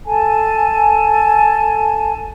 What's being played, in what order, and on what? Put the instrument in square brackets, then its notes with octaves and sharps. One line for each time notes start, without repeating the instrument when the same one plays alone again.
[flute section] A4 G#5 A5